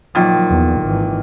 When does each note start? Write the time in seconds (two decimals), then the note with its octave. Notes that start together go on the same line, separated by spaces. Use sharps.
0.15 A#2 D#3 F3 F#3
0.50 E2
0.82 G#1 E3